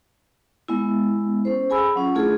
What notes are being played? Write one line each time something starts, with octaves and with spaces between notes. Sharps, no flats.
G#3 B3 E4
C#4 A4 C5
G#4 G#5 B5 E6
F#3 C#4 F4
A3 D4 E4 F4 G#4 A4